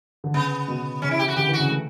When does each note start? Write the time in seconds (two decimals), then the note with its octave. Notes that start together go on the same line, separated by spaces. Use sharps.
0.24 D3
0.34 C#3 B3
0.68 B2
1.02 C#3 C#4
1.11 E4
1.19 G4
1.28 F#4
1.36 D3 G4
1.48 E3
1.53 F#4
1.59 C#3
1.70 A3